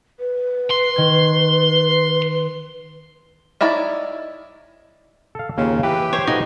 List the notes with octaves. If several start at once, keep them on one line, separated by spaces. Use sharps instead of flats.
B4
C6
D#3 G#6
D#4 E4 C#5 D5
A4 F5
D#2 C#3 A#3 F4
E3 G4 B4
C5 C#5
A2 F3 D#4 F#4 B4